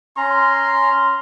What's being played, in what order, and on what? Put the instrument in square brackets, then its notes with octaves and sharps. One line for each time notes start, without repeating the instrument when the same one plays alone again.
[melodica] C#4 A#5 [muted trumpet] C6